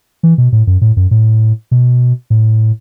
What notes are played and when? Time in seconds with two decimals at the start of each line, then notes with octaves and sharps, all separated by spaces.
0.23 E3
0.38 B2
0.52 A2
0.67 F#2
0.81 A2
0.97 F#2
1.11 A2
1.71 B2
2.30 A2